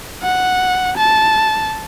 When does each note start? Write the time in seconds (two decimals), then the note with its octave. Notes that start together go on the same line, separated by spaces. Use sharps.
0.23 F#5
0.97 A5